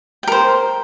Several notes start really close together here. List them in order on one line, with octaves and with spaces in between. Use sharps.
G5 A#4 C5